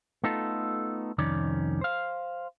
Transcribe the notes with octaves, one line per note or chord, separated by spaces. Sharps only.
A3 B3 D#4 F4 A4
C2 F2 D#3 C#4 D5
C5 F5